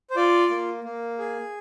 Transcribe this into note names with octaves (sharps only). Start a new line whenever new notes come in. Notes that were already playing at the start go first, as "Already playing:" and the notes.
C5
F4 D5
A#3
A#3
G#4